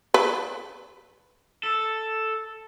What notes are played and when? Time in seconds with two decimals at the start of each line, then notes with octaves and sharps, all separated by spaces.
0.14 B4
1.63 A4